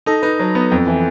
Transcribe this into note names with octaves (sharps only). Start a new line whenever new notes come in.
D#4 A4
D#4 B4
F#3
B3
F2
E3